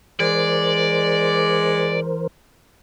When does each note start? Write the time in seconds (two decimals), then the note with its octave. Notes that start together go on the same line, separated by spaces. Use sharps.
0.20 E3 G#3 A#4 C5 D5